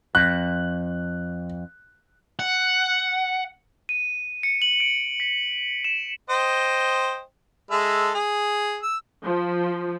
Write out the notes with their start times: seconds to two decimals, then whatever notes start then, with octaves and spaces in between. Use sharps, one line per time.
0.15 F2 F#6
2.39 F#5
3.89 D#7
4.43 C#7
4.62 F#7
4.80 D7
5.20 B6
5.84 E7
6.30 C5 D#5 G5
7.71 G#3 A4 E5
8.14 G#4
8.83 E6
9.25 F3